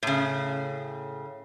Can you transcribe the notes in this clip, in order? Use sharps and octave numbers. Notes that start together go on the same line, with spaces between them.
A2 C#3